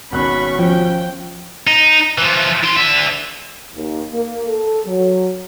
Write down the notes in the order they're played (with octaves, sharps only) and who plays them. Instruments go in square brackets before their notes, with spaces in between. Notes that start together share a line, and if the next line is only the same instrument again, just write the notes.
[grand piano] G#1 B2 F#6 [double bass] C#4 [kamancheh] B5 C#6
[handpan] F3 [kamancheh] G5
[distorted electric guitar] D#4
E3 F3
E4 C6
D3 E5
[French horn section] D#2
A#3
A4
F#3